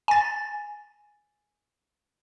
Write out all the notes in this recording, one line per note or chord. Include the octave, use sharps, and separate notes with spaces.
G#5 A6